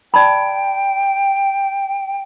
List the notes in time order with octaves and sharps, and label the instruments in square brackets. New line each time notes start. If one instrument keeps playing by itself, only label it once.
[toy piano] D5 A5 B5 [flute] G5